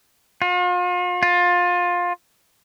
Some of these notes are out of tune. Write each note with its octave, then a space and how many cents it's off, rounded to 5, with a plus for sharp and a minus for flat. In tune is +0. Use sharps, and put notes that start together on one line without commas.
F4 +40
F4 +20